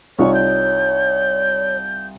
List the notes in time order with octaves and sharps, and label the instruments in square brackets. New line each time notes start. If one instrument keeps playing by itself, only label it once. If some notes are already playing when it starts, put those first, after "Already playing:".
[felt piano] C2 D#4 F4 [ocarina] C#5 [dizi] C#6
[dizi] G6